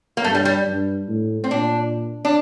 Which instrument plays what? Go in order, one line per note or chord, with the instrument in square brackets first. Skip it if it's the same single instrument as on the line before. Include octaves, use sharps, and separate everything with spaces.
[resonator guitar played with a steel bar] A#3
[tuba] G2 [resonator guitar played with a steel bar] A3
[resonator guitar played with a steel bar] G3
G3
[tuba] G2
A2
[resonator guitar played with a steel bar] C4
[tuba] A#2 [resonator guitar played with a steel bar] D4
[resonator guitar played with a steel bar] D4